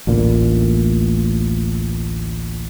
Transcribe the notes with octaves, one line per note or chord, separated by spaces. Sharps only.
A1 D2 A#2